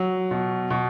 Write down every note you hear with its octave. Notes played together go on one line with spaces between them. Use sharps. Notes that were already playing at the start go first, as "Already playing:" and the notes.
Already playing: F#3
B2
B2